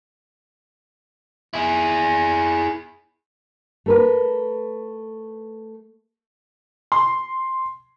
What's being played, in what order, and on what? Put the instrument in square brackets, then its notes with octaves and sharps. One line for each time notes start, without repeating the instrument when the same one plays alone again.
[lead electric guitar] E4 G#4
[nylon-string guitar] A3 A#4 B4
[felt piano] C6